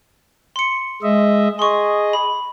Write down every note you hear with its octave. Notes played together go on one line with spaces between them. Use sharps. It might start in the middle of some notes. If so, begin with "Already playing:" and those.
C6 C#7
G#3 D#5 E5
G#4 D#5 C6 C#6
B5